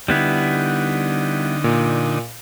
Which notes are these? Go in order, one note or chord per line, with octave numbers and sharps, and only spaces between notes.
D3 G3 B3 D#4 E4
A#2